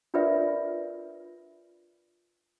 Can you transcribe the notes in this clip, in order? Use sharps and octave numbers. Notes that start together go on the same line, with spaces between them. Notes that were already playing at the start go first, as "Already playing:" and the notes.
D4 F4 A#4 B4 D5 E5